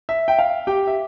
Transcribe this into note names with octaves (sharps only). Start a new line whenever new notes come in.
E5
G5
F5
G4 G5
E5